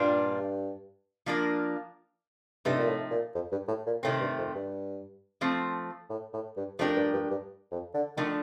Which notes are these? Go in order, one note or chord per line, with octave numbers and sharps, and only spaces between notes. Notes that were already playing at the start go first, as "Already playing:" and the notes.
Already playing: G2 A#2 G3 D4 F4
F3 A#3 D4 F4 A#4
G2 C3 F3 A3 D#4
A#2
A2
A#2
F2
G2
A2
A#2
A2 C3 D#3 A3 C4
G2
F2
G2
F3 A3 C4
A2
A2
G2
F2 F3 A3 D4 G4 A#4
G2
G2
G2
F2
D3
D3 D#3 F3 A3